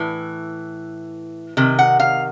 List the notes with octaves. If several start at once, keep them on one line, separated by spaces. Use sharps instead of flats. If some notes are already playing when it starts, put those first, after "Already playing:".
Already playing: A2 E3
C3 D#3
F#5
F5